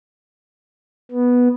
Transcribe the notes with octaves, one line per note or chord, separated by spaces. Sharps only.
B3